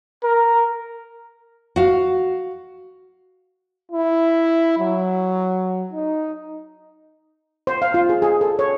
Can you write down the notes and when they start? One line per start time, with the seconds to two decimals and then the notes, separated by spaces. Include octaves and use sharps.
0.23 A#4
1.76 F#4 F5
3.92 E4
4.79 F#3
5.92 D#4
7.67 C5
7.82 F5
7.94 F4
8.09 G#4
8.22 G#4
8.41 A4
8.59 C#5